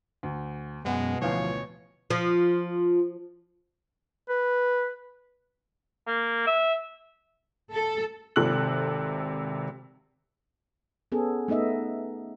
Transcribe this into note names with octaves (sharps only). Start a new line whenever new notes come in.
D2
F#2 B2 G#3 B3 F#5
A1 D2 E3 F3 C#5 F5
F3
B4
A#3
E5
A4
G#1 C3 A4 F#6 F#7
B3 C#4 G#4 A4
A3 B3 D#4 D#5 E5